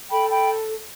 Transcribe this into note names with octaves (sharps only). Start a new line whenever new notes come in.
A4 G5 B5
G5 B5